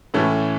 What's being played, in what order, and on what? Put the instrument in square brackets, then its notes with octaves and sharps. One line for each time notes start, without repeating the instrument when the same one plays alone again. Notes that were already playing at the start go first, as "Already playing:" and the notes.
[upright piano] A2 E3 A3 C#4 E4